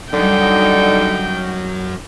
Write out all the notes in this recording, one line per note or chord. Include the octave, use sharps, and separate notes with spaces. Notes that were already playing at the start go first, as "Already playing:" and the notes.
F#2 D3 G3 D#4 G5